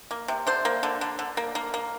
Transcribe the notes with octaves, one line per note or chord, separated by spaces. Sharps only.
A#3
C3
D3 C5
A#3
D3
D3
D3
A#3
A#3
A#3